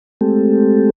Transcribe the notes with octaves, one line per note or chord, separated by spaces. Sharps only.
G#3 A3 C4 G4 A4